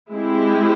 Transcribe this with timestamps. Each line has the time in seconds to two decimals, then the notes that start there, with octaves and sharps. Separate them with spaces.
0.11 G#3 C4 E4 G4